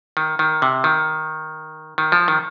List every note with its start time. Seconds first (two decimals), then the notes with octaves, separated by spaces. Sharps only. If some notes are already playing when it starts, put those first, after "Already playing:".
0.17 D#3
0.39 D#3
0.62 C3
0.84 D#3
1.98 D#3
2.12 F3
2.28 D#3